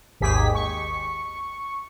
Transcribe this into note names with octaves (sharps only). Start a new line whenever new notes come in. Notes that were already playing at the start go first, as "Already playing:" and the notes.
G#1 D#2 G#2 G4 G#4 B6
C#6